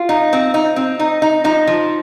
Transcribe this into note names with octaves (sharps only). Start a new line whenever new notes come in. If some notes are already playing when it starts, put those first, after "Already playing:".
Already playing: F4
D#4
C4
D#4
C4
D#4
D#4
F3 D#4
F3